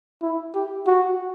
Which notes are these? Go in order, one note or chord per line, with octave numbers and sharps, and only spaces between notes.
E4
G4
F#4